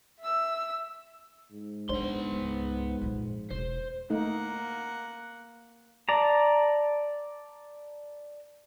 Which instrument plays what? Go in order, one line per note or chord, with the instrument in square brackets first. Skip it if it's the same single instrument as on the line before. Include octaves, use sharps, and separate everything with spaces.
[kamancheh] E5 E6
[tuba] G#2
[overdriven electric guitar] B3 C6 [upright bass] D4 [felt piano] C5
[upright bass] C#2
F2 A#2
[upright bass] E1 [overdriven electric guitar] C5
[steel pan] A3 D#4 [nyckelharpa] A#3 F#5
[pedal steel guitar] D5 A5 A#5